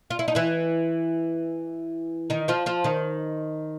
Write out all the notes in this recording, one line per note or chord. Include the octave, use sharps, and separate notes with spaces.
F4
E4
D#4
E3 E4
D#3 D#4
F3 F4
F3 F4
D#3 D#4